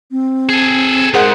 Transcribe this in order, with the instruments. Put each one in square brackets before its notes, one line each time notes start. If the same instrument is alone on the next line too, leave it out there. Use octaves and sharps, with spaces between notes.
[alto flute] C4
[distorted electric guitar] G#4 A4
[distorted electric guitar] B1 G#2 [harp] G#4 C5 F#5 [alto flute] A#4